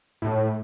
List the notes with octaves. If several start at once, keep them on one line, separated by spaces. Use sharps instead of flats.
A2